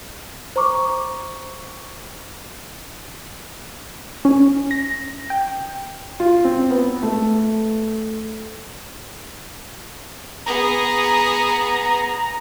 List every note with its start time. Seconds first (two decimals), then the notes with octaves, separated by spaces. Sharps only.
0.56 C5 A#5 C#6 D6
4.25 C#4
4.71 A#6
5.30 G5
6.20 F4
6.45 C4
6.71 B3
7.03 A3
10.46 B3 G#4 A#5